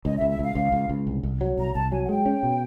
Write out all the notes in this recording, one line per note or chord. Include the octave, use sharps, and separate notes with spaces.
C#2 D#5
E5
C#2
E5
C#2 F5
C#2
C#2
C#2
C2
C2
F#3
C2 A#5
C2 A5
F#3 G#5
F#5
G#3 G5
C#4
B2